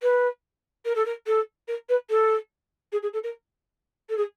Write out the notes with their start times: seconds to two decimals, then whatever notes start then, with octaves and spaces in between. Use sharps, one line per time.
0.02 B4
0.85 A#4
0.95 A4
1.05 A#4
1.26 A4
1.68 A#4
1.89 B4
2.09 A4
2.92 G#4
3.02 G#4
3.13 A4
3.23 A#4
4.09 A4
4.17 G#4